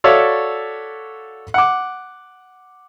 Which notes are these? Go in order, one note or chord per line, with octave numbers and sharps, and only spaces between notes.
F#4 A4 C#5 D5 E5 F5
F#5 D6